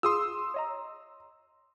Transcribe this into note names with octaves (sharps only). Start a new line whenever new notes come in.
F4 G#4 C6 D#6 E6
C#5 D#5 A#5